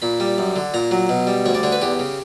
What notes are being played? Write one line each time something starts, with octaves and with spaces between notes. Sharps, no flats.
A#2 B5
G3
F#2
D3
A#2 A#5
F#3
B2
G3
D2 C#5
D5
D3 C#5
B4
E2 G4
C#3